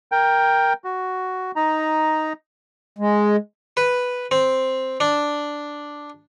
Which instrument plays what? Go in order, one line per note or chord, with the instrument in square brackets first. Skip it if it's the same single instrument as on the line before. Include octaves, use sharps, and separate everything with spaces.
[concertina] A#4 G5
F#4
D#4 A#5
[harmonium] G#3
[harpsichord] B4
C4
D4